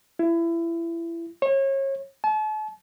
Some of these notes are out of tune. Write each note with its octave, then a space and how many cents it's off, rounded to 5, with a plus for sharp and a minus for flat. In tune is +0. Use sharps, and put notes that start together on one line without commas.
E4 +25
C#5 -30
A5 -40